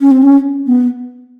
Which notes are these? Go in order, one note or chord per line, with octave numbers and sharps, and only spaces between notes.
C#4
C4
C#4
B3